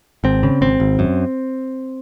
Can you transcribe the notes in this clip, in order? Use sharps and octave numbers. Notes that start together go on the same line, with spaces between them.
G#1 C4
C#3
G#1 C4
G#1
F#2